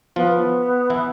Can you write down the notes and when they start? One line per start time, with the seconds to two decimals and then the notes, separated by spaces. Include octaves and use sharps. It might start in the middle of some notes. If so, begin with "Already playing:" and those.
0.16 F3 B3 F4
0.90 E3 E4